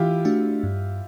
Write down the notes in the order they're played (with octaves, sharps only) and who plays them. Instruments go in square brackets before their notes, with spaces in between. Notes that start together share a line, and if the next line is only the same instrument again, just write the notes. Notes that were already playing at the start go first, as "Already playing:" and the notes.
Already playing: [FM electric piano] E3 [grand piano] E4 F4 G4
[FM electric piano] A3 D4 F#4
G2